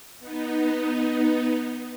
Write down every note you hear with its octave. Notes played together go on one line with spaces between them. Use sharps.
B3 D#4